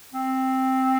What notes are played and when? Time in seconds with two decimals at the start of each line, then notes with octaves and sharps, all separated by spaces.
0.14 C4